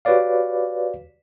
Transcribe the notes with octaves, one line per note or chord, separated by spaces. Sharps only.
F#4 G4 B4 C#5 D5 F5